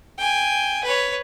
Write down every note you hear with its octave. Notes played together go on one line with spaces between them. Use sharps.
G5 G#5
B4 C#5